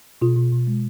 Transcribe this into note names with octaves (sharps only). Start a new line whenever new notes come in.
B2 F4
B2
B2
G#3